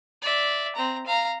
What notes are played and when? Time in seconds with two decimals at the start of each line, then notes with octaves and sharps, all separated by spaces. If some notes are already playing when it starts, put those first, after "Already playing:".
0.22 D5 E5
0.75 C4 A#5
1.06 F5 A#5